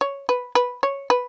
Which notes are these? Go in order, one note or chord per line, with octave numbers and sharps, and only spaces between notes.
C#5
B4
B4
C#5
B4